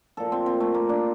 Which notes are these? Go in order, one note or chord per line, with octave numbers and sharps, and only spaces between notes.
A#2 F3 A4
C4
C4
A3
A#3
D4